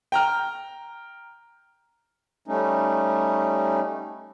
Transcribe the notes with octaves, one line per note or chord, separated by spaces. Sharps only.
G5 A#5 F6
G3 A3 C#4 D#4